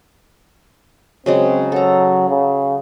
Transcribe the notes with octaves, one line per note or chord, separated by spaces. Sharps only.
C#3 F#3 G#3 C4
F#3 A4 A#5
C#3